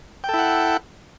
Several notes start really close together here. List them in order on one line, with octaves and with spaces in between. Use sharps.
G5 A4 E4 F#5